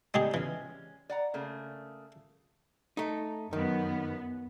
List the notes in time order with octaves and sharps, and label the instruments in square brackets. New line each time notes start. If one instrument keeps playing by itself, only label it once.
[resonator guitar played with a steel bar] D#3 G3 D#4 [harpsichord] G#3 G4 G#4
[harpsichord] E3 [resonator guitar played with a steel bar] G#3 C#4
[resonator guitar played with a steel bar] D5 F#5 A#5
C#3 A3 A#3
[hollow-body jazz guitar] A3 D#4
[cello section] F#2 B3 [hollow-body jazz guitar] D#3